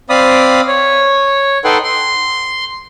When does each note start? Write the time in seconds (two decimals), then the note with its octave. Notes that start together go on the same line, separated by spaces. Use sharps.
0.10 C4 D5 F5 B5 D#6
0.67 C#5
1.64 D#4 A4 B4 F#5 G5 C6
1.84 C6